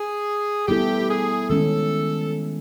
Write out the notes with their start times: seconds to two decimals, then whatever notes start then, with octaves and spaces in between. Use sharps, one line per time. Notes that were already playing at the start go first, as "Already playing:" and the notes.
Already playing: G#4
0.68 G3 B3 E4 G4 A4
1.09 G#4
1.49 D#3 G#3 C#4 A4